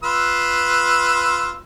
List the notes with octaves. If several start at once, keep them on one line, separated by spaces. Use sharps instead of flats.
F4 B4 E6